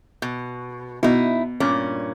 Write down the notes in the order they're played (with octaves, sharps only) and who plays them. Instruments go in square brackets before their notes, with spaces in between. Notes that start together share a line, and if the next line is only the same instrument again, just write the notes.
[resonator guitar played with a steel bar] B2
[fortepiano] B2 [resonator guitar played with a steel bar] D#4 E4
[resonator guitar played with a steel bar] G2 A#2 C#4